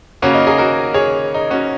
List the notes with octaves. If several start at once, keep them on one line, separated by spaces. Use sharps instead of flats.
C#3 A#3 C#4 F#4
D#4
D#4 G#4
F#4 A#4
G#4 C#5
D#4
C#4 F#4